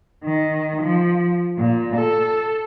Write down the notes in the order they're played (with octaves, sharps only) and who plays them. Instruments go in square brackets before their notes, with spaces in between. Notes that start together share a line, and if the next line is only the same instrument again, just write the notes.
[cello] D#3
F3
A#2
A4